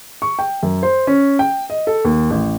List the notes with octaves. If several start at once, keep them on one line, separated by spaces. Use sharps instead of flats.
C#6
G5
F#2
C5
C#4
G5
D#5
A4
D#2
A1